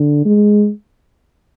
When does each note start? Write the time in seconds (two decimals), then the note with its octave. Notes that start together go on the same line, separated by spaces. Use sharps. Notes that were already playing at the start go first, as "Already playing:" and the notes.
Already playing: D3
0.25 G#3